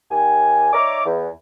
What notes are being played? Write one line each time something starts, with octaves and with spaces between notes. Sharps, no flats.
D#2 G4 G#5
D#4 C#5 D5 E5 A#5 D6
E2